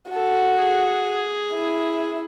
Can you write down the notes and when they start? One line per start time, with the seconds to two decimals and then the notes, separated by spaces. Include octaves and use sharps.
0.12 F#4 A4
0.59 G#4
1.53 E4